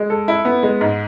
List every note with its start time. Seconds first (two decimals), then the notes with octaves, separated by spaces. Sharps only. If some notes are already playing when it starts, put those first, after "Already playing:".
Already playing: G#3
0.10 A4
0.28 E4
0.45 B3
0.63 G#3
0.81 G#2